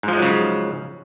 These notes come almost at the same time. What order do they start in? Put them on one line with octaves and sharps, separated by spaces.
G#2 F3 G#3 F#3 C#3